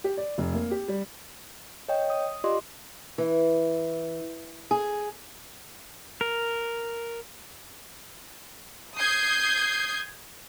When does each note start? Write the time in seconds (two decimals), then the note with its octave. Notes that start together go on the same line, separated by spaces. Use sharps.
0.04 G4
0.17 D5
0.38 F1
0.54 A#3
0.71 G4
0.88 G3
1.88 C#5 D#5 G5
2.10 D#6
2.44 F4 G4 D5 D#5 C6 D6
3.18 E3
4.71 G#4
6.21 A#4
8.97 D#6 G6 G#6 C7